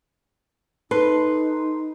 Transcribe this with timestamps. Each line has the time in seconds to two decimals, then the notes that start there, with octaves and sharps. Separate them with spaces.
0.91 D#4 A4 B4 C6